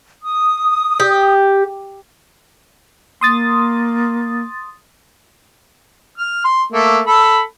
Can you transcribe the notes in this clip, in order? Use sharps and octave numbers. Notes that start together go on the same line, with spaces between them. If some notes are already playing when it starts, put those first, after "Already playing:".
D#6
G4
A#3 C6 D#6 A6
F6
C6
A3 A#3
A4 B5